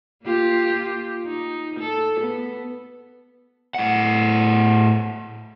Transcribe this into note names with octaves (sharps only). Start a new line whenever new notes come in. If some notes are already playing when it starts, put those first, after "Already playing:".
A#3 F4 G4
D#4
A4
B3
A2 F#5